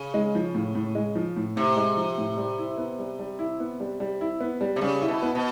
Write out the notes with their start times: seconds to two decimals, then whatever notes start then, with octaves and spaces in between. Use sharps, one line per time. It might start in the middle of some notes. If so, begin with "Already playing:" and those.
Already playing: C#3
0.14 G#3
0.35 F3
0.55 A2
0.75 A2
0.95 G#3
1.15 F3
1.37 A2
1.56 A2 C3
1.76 G#3
1.97 F3
2.18 A2
2.37 G3
2.58 E4
2.78 B3
2.99 G3
3.19 G3
3.39 E4
3.60 B3
3.80 G3
4.00 G3
4.21 E4
4.41 B3
4.61 G3
4.76 C3
4.81 C#3 G3
5.01 E4
5.08 B2
5.23 B3
5.35 B2